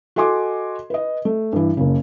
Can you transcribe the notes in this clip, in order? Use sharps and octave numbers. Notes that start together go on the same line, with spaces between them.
F#4 A4 D#5 G#5 C6 D6
B4 D#5
A3
G2 E3
F#1 C#3